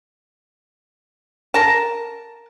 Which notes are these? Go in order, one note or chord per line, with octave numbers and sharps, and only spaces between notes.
A#4 A5